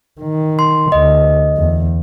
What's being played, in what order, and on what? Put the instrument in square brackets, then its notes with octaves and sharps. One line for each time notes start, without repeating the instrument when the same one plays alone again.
[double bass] D#3
[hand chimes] C6
[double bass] D2 [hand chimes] D#5
[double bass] E2